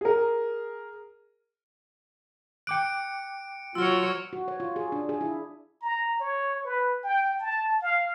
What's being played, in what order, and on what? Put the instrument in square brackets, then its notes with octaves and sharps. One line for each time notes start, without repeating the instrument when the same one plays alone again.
[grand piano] G#4 A#4
[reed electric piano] G5 D6 F#6 [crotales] C#7 D7
[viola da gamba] F#3 F#4 C#5 [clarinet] F4 [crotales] E6 F6
[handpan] F#4
C#5
F4
G#4
D4
G#4
E4
[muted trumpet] A#5
C#5
B4
G5
A5
F5